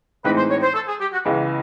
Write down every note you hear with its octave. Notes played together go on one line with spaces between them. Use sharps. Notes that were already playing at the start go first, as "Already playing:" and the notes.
A2 E3 G#3 C4 D#4 B4
C5
C#5
C5
A4
G#4
G4
F#4
C#2 C#3 E3 G#3 B3